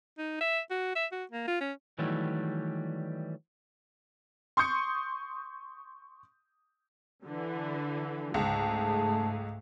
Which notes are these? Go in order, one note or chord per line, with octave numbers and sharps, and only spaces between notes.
D#4
E5
F#4
E5
F#4
A#3
F4
C#4
D#3 E3 F#3 G3 A3
C6 C#6 D#6 G6 C#7
D3 E3
C#2 G#2 A3 G#4 A5